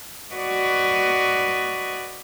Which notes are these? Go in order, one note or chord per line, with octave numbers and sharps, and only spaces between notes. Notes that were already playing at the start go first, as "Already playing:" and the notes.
F#4 B4 D5 D#5 C#6